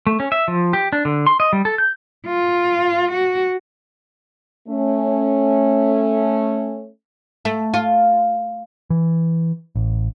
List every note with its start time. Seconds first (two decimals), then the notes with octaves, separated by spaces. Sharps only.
0.07 A3
0.20 C#4
0.32 E5
0.48 F3
0.73 G4
0.93 D4
1.05 D3
1.26 C6
1.40 D#5
1.53 G3
1.65 A4
1.78 G6
2.27 F4
3.12 F#4
4.68 A3 C#4
7.45 A3
7.74 F4
8.90 E3
9.75 A1